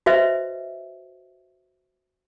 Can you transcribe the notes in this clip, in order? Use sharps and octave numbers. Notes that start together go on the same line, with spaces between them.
F#4 B4 C5 D#5 E5